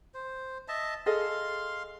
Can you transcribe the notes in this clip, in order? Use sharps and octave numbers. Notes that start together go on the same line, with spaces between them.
C5
D#5 E5 A5
G#4 A4 D#5 F5 C6